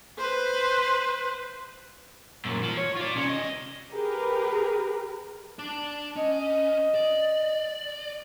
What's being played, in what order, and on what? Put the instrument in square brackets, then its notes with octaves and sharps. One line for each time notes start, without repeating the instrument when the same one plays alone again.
[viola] B4 C5
[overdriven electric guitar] F#2 A#2
F3
C#5
F4 D5
C3 C#4
C#2 D#5
[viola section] G4 G#4 A#4 B4
[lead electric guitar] D4 D5 [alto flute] A5
[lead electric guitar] C#4 [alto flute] D#5
[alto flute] D#5
[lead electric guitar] D5